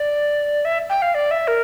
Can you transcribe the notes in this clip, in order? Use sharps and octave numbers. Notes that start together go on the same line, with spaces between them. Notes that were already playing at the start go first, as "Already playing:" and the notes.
Already playing: D5
E5
G5
F5
D5
E5
A#4